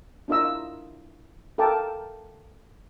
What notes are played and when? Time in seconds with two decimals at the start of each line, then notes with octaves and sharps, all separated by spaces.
0.28 D4 E4 F4 A#4 D#5 E6
1.58 A4 A#4 F5 G5 A5 D6